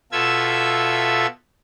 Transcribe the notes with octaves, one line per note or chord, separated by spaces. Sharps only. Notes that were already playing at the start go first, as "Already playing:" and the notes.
B2 F4 A4 E5 E6 G#6